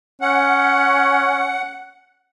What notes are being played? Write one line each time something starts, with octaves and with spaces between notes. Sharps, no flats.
C#4 F#5